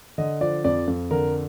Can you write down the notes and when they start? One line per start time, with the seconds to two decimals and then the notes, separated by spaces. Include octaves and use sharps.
0.18 D3 D#5
0.41 F3 D5
0.64 F2 D5
0.88 F2
1.11 D3 A#4